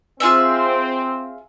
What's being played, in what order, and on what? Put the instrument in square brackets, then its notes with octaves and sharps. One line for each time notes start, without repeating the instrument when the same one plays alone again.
[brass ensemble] C4 [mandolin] F4 G#4 E5